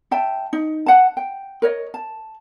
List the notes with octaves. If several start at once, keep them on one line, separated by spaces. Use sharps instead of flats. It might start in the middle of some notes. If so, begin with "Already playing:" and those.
E5 G5 A5
D#4
F#5 A5
G5
A#4 C#5 D#5
A5